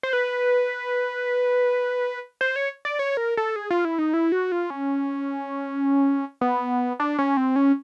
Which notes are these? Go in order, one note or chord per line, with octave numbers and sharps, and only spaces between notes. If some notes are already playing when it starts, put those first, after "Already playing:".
C5
B4
C5
C#5
D5
C#5
A#4
A4
G#4
F4
E4
D#4
E4
F#4
F4
C#4
B3
D4
C#4
C4
C#4